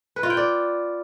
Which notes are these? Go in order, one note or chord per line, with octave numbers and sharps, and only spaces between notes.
B4
F4
G5
D5